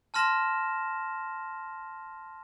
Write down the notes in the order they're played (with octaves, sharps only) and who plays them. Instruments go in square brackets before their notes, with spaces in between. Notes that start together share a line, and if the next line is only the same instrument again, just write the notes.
[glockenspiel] A5 C6 F6 A#6 E7